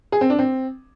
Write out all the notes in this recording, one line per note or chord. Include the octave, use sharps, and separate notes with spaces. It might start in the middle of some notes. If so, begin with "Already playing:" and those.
G#4
C4
D4
C4